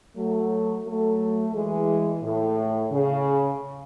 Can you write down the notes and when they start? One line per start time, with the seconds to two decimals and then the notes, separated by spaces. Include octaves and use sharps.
0.16 F#3 A3
0.85 F#3 A3
1.54 E3 G#3
2.23 A2
2.92 C#3